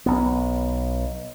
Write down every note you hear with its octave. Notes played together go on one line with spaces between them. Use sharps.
B1 B3